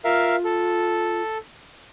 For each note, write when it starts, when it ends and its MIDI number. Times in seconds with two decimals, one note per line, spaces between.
0.04 1.22 65
0.04 0.36 70
0.04 0.36 76
0.04 0.36 77
0.44 1.38 69